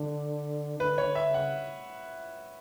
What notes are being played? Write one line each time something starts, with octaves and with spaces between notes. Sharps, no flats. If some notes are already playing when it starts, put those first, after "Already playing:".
Already playing: D3
D3 B4
C#5
D3
E5
C#3
F#5